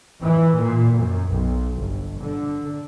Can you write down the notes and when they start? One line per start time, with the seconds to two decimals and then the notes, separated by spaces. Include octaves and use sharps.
0.22 E3
0.58 A#2
0.96 F#2
1.32 B1
1.79 G1
2.21 D3